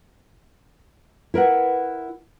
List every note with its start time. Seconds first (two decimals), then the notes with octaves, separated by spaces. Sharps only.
1.34 E4 A#4 B4 F#5